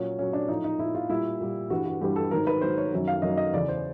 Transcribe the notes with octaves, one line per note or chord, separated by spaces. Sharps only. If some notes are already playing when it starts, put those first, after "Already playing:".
Already playing: A#2 F#3 C#4
A#2 F#3 C#4
D4
A2 F3 D#4
D#4
A2 F3 E4
F4
A#2 G3 E4
A#2 G3
G2 E3 G3 F#4
F#4
G2 E3 G3 G4
A4
G#2 D#3 F#3 A#4
B4
G#2 D#3 F#3 C5
C#5
F#2 D#3 F#3
F5
F#2 D#3 F#3 D#5
D#5
E2 C#3 E3 D5
C5